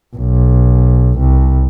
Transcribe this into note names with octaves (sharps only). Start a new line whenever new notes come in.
B1
C2